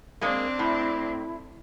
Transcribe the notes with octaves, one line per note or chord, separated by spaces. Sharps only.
G#3 A#3 C4 D4
A2 E4